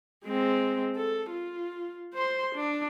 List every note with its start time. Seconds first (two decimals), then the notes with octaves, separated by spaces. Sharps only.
0.25 G#3 C4
0.96 A4
1.30 F4
2.14 C5 C6
2.55 D4